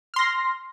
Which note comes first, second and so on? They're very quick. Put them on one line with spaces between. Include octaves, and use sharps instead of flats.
F6 C6 A#6